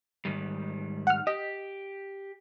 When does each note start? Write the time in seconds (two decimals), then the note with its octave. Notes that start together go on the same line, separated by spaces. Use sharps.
0.25 G#2 D#3 G3
1.07 F#5 F6
1.27 G4 D#5